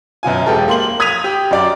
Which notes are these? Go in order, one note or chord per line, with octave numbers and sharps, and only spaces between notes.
F#2 B2 F4 G#5
E1 G4 A4
A#3 C6 F#7
D#6 G#6 B6 D#7 F7
G4
F#2 D5